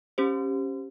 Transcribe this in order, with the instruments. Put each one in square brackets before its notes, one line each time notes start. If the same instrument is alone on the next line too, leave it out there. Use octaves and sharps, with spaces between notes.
[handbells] C#4 G4 C5